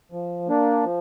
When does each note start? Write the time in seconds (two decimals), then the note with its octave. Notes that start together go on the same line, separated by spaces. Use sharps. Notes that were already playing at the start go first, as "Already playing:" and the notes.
0.12 F3
0.48 A#3 D4
0.84 F3